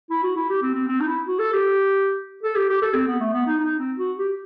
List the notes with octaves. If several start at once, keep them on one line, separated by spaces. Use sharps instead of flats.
E4
F#4
E4
G4
C4
C4
C4
D#4
E4
F#4
A4
G4
A4
G4
G4
A4
C4
B3
A3
B3
D#4
D#4
C4
F#4
G4